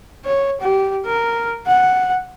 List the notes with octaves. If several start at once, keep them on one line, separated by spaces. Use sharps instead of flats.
C#5
G4
A#4
F#5